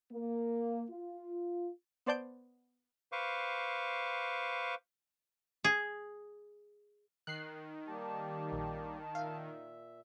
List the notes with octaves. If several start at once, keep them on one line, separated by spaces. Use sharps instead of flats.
A#3
F4
B3 C5 D5 A5 G6 D7
B4 C5 F5 C#6 D6
G#4
D#3 F#6 C7
G3 A#3 G4 A5
A#1
A#2 E5 F5